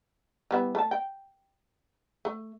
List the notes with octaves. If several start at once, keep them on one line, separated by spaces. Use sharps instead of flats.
G3 B3 E4
A3 A5
G5
A3